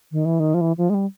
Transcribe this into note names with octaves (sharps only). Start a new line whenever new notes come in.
D#3
E3
D#3
F3
E3
F3
G#3
G3